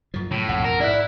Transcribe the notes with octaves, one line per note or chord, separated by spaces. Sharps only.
F#2 F3
A2
A#1 F2 B2 F#5
A#4
G#2 E4 D5 E5 F#6